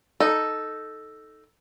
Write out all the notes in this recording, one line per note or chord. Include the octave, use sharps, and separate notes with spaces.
D#4 A4